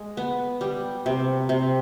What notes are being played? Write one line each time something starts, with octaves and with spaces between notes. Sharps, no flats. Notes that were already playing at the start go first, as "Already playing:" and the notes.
Already playing: G#3
B3
G3
C3
C3